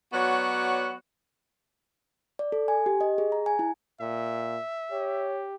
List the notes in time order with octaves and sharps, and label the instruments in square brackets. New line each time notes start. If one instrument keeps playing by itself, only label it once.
[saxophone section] F#3 B3 F#4 C#5 D5 F#5
[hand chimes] D5
A4
G#5
G4
D#5
G#4
A#5
G#5
E4
[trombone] A#2 [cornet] E5
[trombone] G4 [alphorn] C#5